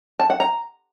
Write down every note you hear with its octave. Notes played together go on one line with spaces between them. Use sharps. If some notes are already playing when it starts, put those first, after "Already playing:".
A5
F#5
A#5